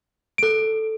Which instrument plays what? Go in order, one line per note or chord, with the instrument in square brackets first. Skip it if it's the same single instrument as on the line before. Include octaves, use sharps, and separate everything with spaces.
[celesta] A4 D7